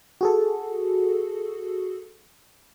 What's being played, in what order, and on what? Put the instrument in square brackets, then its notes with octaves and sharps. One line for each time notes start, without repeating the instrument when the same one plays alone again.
[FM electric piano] F#4 G#4 A4